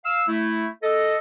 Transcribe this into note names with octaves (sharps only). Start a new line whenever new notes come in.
F5 E6
A3 E4
A4 D#5